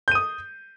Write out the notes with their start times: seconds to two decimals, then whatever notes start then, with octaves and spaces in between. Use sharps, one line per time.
0.08 G6
0.11 D#7
0.15 D#6